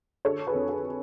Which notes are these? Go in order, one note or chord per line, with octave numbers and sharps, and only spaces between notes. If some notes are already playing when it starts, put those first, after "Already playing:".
D3 A4 C#5
G#4 B4
F2
G#4